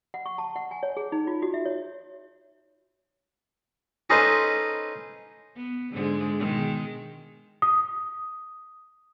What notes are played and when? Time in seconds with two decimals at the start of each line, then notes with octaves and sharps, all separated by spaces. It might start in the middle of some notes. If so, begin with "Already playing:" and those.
0.14 F#5
0.26 C#6
0.38 A5
0.56 F#5
0.71 G#5
0.83 C#5
0.97 G#4
1.12 D#4
1.27 F4
1.42 F#4
1.54 E5
1.65 C#5
4.10 C#4 D#4 G#4 A4 B4 C5
5.56 B3
5.91 G#2 D3 G#3
6.38 B2 D#3 G#3
7.62 D#6